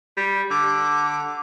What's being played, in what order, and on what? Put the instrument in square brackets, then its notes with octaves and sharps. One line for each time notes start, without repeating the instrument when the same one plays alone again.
[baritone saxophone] G3
[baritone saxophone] D3 [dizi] D6